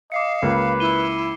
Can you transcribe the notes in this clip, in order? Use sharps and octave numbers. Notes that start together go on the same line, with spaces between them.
D#5 F5 D6 C7 C#7
C#2 A#3 B4
E4 D#7 G7